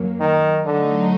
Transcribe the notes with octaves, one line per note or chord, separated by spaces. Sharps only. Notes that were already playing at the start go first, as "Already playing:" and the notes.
Already playing: F#2 F#3 A#3
D#3
D3 F#3 A3 D#4